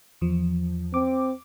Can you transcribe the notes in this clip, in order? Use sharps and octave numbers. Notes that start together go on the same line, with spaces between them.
E2 F3
C4 D6